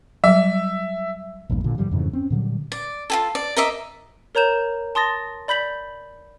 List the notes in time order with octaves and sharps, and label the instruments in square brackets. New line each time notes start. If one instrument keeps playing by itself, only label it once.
[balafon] F#3 G3 [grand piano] E5
[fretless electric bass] A#1 E2 G2 A#3
A#2 D3
G#2 D3 F3 G3
F2 G#2 C#3 E3
C4 C#4
A#2 D3 F#3 G3
[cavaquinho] D5
F4 G#4 A4
D5
A#4 D#5 E5 D6
[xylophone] A#4 C#5 A#5 G6 E7
A5 C6 D#6 A6 A#6
D5 B5 G6 B6 F#7